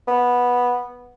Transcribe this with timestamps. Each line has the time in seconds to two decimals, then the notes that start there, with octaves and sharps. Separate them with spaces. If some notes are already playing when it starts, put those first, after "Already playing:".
0.08 B3